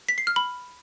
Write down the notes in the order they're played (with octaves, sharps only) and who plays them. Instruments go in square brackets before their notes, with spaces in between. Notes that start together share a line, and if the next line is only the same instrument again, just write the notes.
[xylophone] B6
C7
F6
B5